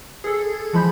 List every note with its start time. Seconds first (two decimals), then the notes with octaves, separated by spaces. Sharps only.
0.24 G#4 A4
0.73 E3 F3 G#3 B5 G6